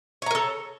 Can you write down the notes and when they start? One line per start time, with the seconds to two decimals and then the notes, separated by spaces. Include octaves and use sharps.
0.22 C#5
0.26 A#5
0.31 A#4
0.35 A4